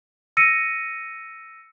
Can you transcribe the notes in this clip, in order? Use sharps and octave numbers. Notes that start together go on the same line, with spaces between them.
E6 A#6 C#7 D#7